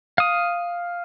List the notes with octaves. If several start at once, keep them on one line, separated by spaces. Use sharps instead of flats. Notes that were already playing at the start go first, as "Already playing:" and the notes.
F5 D#6